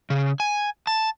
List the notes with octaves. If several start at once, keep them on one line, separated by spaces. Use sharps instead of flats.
C#3
G#5
A5